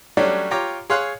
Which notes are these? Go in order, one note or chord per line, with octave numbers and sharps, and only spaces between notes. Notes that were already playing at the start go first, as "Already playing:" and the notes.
F#3 G3 A3 C#4 D4
F4 G4 C#5 A#5 D6
G#4 C#5 F5 C6 F#6